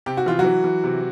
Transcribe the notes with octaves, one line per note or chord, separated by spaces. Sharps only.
C3 G4
F#4
E3 F4
F#3 F#4
E3
E3
C3